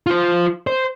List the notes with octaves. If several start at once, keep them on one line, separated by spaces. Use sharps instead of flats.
F4 C5
C5